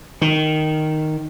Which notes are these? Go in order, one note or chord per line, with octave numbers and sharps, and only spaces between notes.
D#3